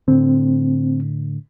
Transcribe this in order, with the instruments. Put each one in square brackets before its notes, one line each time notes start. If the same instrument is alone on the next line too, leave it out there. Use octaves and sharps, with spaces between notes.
[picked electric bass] A2 D3 [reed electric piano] C4